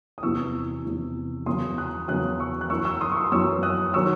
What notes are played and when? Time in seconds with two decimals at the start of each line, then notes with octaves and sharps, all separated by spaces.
0.18 D#6
0.23 E2 C3 E3 C#6 E6
0.85 E2 C3 E3
1.46 E2 C#3 F#3 C6 D#6
1.78 D#6 F#6
2.08 E2 C#3 F#3 D#6 F#6
2.39 C#6 E6
2.61 F#6
2.70 F#2 E3 C#6 E6
2.85 C#6 E6
3.01 C6 D#6
3.12 C#6
3.17 C6 D#6
3.32 F#2 E3 C#6 E6
3.63 D#6 F#6
3.94 D#3 F#3 C#6 E6